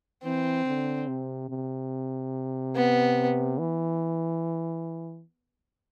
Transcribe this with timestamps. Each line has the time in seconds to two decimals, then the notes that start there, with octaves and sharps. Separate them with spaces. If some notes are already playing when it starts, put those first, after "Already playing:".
0.24 E3 C4
0.66 D3
1.08 C3
1.49 C3
2.75 B3
3.59 E3